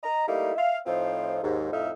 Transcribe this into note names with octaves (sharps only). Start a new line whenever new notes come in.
D#5 A#5
G3 A3 A#3 D#4 E4
E5 F5
A2 F3 C4 D#4 F4
D#2 G#2
F2 A2 D#4 E5 F5